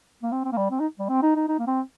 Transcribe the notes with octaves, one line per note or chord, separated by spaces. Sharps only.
A#3
C4
C4
A#3
G3
C4
D#4
G3
C4
D#4
D#4
D#4
A#3
C4